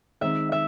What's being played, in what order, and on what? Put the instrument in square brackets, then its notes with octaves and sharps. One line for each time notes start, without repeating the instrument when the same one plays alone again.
[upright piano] D#3 G#3 C4 D#4 [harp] E5
[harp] E5